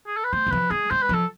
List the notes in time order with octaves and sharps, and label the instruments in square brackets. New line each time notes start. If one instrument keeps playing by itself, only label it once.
[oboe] G#4
A4
B4
[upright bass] A3 [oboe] C5
[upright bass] E3
[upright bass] F3 [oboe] B4
[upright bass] G#3 [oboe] G#4
[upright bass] G#3 [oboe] C5
[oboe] B4
[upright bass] F3 [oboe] A4